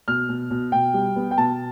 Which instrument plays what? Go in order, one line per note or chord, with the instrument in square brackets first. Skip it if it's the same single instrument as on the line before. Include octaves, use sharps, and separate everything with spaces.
[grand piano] B2 F6
B2
B2
B2 G5
G3
B3
G5
B2 A5